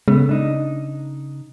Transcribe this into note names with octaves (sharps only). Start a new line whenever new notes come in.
C#3 G#3 A3 B3
D4 D#4